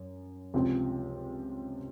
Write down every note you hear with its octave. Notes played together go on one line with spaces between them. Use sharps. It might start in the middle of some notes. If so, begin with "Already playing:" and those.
Already playing: F#2
C#2 C3 F3 C4